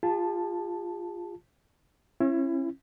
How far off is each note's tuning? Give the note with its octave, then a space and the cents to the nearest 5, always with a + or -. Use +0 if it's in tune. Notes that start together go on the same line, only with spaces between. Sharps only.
F4 +0 G#4 -45 A5 +0
C#4 -35 E4 +25